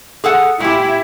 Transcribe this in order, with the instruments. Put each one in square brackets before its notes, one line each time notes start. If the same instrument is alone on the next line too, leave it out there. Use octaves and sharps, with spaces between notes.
[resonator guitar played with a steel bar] G#4 A4 F#5
[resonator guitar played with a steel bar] A#2 G4 [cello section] E4